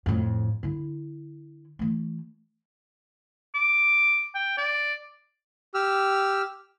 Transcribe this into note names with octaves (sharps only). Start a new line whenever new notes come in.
F2 A2
D3 E4
E3 A3
D6
G5
D5
G4 E6 F6